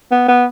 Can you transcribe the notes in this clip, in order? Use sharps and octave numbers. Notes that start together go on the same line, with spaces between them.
B3
B3